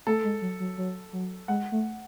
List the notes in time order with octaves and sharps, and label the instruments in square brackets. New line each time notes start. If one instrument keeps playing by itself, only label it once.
[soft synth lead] A3 [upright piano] A4
[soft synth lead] G#3
F#3
F#3
F#3
F#3
[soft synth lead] G#3 [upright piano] F#5
[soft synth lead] A3